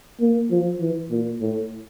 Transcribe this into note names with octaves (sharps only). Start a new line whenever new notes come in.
A#3
F3
E3
A#2
A2